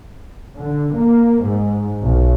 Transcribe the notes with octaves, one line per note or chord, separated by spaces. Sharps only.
D3
A#3
G#2
B1